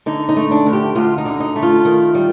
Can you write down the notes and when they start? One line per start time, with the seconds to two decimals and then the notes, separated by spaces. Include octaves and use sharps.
0.06 D3 D#4
0.29 D#4
0.36 A3
0.51 D4
0.66 D2
0.73 G4
0.95 D2 F4
1.18 D#4
1.25 D3
1.40 D#4
1.56 A3
1.63 F4
1.85 D#3
2.15 G3